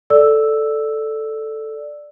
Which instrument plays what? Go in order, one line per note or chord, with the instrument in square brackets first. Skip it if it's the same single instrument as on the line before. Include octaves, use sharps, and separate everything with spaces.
[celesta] A4 D5 E6